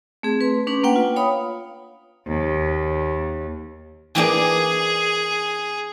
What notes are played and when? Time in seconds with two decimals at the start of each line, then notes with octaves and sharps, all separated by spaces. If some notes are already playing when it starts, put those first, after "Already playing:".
0.23 A3 C4 G#4
0.41 B4 C6
0.67 A3 C#4 D4 B4
0.83 A#3 B4 F#5 G5
0.96 F4
1.16 C#5 F5 B5 D#6
2.28 D#2
4.15 E3 A#3 D4 G#4